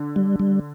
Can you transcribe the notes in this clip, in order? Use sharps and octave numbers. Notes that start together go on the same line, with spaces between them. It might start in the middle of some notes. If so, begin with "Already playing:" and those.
Already playing: D3
G3
G3